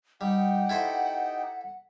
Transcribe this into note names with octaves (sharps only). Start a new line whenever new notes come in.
G3 D#4 G4 F#5 G5
E4 A4 C5